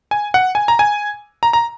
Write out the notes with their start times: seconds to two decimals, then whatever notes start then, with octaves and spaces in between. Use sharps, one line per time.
0.11 G#5
0.34 F#5
0.55 G#5
0.68 A#5
0.79 G#5
1.43 A#5
1.53 A#5